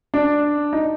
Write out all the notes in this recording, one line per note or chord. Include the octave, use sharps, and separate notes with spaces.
D4
D#4